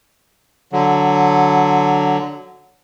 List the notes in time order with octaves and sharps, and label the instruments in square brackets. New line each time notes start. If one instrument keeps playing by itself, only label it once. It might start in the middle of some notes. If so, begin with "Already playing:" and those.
[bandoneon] D3 F#3